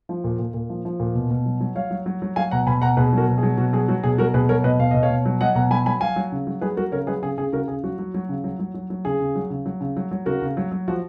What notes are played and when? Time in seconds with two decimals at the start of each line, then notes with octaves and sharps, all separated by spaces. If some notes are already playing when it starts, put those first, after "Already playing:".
0.09 F3
0.24 A#2
0.39 A#2
0.54 A#2
0.69 F3
0.85 F3
1.00 A#2
1.15 B2
1.31 B2
1.46 F#3
1.60 F#3
1.76 F#3 C#5 F5
1.91 F#3
2.06 F#3
2.22 F#3
2.36 F#3 F5 G#5
2.51 B2 F#5 A#5
2.67 B2 G#5 B5
2.82 B2 F#5 A#5
2.97 B2 G#4 B4
3.13 F#3 F#4 A#4
3.28 B2
3.38 G#4
3.43 F#3
3.57 B2 F#4
3.73 F#3 G#4
3.88 F#3 F#4
4.04 B2 G#4
4.18 F#3 F#4 A#4
4.34 B2 G#4 B4
4.49 F#3 A#4 C#5
4.64 B2 B4 D#5
4.79 B2 F5
4.91 B2 D#5
5.03 C#5 F5
5.10 B2
5.25 F#3
5.41 F#3 D#5 F#5
5.55 B2 F#5 A#5
5.70 F#3 G#5 B5
5.86 F#3 G#5 B5
6.01 F#3 F5 G#5
6.16 F#3
6.32 C#3
6.47 F#3
6.61 F#3 G#4 B4
6.77 F#3 F#4 A#4
6.92 C#3 A#4 C#5
7.07 F#3 G#4 B4
7.22 C#3 G#4
7.38 C#3 G#4
7.52 C#3 F#4 A#4
7.68 C#3 G#4
7.83 F#3 F#4
7.98 F#3
8.14 F#3
8.29 C#3
8.44 F#3
8.59 F#3
8.74 F#3
8.90 F#3
9.05 C#3 G#4
9.20 C#3
9.35 F#3
9.50 C#3
9.66 F#3
9.81 C#3
9.96 F#3
10.11 F#3
10.26 C#3 F#4 A#4
10.42 C#3
10.57 F#3
10.72 F#3
10.88 F3 F#4